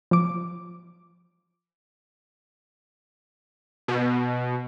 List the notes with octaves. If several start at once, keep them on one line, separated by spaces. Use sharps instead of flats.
F3 D6
B2